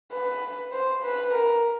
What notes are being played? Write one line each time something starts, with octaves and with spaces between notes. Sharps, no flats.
B4
C5
B4
A#4